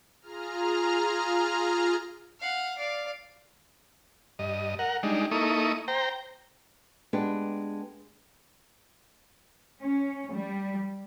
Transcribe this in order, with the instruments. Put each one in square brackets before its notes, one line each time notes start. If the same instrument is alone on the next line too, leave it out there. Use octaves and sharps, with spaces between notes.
[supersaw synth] F4 G#4 A#5 F6
[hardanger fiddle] F5 F#5
D5 F5
[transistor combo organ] G2 D#5
A#4 F#5
G3 G#3 D4 D#4
A#3 D#4 E4 A4 C#6 D#6
C5 G5 A#5
[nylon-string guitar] G#3 B3 D4 G4
[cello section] C#4
G3